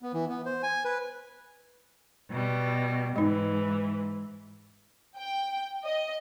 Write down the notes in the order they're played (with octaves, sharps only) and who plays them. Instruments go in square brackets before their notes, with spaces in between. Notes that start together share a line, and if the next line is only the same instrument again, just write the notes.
[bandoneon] B3
E3
B3
C5
G#5
B4
[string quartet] B2 G3
[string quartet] G#2 E3 [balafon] G#3 D#4
[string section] G5
D#5